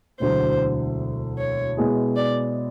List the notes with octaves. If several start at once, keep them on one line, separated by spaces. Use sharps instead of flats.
E1 D2 D3 F#3 C5
C#5
B2 G#3 B3 E4 G#4
D5